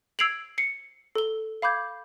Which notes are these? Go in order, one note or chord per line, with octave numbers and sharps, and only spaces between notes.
E6 G#6 C7 D7 F7 F#7
C7 C#7
A4 G7
F5 B5 D6 G6 G#6